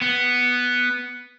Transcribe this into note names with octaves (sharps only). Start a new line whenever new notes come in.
B3